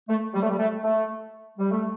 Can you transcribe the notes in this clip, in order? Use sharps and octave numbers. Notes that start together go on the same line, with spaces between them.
A3
G3
A3
G3
A3
A3
G3
A3